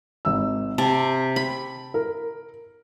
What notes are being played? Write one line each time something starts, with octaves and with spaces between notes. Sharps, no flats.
G#1 E6
C3 A5
B5
A#4